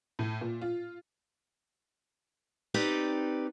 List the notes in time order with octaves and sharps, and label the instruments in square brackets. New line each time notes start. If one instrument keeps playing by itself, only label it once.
[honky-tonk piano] A2
A#2
F4
[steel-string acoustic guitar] C4 D#4 G4 B4 D5